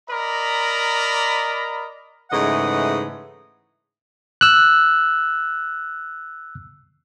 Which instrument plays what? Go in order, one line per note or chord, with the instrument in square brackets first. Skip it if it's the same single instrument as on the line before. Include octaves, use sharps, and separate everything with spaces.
[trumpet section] A#4 D5 D#5 A#5 B5
[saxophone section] G#2 C#3 E3 A3 D#5 F#5
[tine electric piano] E6 F#6